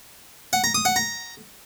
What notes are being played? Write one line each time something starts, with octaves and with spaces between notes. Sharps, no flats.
F#5
A#5
D#6
F#5
A#5